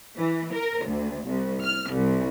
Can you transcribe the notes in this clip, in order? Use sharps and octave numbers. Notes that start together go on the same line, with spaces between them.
E3
A#4
D2
C2
F6
C2